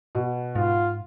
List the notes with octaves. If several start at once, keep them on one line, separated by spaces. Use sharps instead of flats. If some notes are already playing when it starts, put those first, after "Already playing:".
B2
G#2 F4